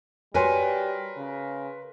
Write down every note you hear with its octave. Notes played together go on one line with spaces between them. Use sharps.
G3 F#4 A#4 B4 C#5 G#5 C6
C#3